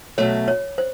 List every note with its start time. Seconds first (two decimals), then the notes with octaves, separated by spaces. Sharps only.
0.18 B2 F#3 A3 C#5
0.48 C#5
0.78 C5